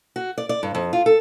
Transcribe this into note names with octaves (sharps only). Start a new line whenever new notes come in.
F#4
D5
D5
G2
F2
F4
A4